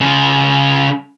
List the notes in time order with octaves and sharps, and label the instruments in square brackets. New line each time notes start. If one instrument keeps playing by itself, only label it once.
[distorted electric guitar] C#3 F4